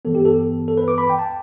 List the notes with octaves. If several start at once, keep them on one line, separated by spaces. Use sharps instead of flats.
G2 E3 B3 A4
G4
A4
A4
B4
D6
B5
G5
A5